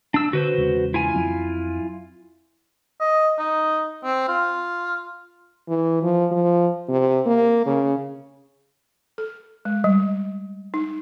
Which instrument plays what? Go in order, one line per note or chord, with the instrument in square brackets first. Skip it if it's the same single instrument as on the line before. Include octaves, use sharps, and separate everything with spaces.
[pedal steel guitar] D4 E6
[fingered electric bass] D3 [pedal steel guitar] F#4 B4 C5
[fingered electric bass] E2 C#3 G#3
[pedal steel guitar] E4 F4 G#5
[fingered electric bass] F2 F#3 C4
[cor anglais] D#5
D#4
C4
F4
[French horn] E3
F3
F3
C3
A#3
C#3
[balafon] A4
G#3
G3
D#4